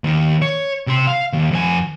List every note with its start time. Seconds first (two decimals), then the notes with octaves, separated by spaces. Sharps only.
0.04 D#2 D#3
0.42 C#5
0.87 C3 C6
1.07 F5
1.33 D#2
1.51 F2 G#5